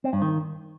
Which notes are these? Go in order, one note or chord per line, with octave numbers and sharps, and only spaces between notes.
C4
G2
D#3